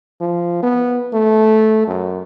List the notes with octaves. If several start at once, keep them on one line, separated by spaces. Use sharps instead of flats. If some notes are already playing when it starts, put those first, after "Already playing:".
F3
B3
A3
F#2